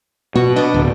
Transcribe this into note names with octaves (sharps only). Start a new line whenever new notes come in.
B2 F#4
B3 D4 D#5
D1